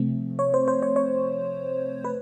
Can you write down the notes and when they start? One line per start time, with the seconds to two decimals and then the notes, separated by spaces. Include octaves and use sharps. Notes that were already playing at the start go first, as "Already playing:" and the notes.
Already playing: C3 F3 A3 C4
0.39 C#5
0.54 C5
0.68 C5
0.82 C#5
0.96 C#5
2.04 B4